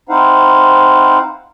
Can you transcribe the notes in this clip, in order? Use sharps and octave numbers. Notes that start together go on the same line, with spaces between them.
C4 D#4 E4 C5 F5 F#5